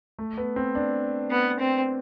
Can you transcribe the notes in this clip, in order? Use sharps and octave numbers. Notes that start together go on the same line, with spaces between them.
A3
B3
C4
D4
B3
C4